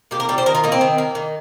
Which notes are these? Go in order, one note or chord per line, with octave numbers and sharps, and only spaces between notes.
A#3 G4
A#4
G3 G4
C5
D#3 A#4
F4
A#3 D#4
C4
D#3
A#3
D#3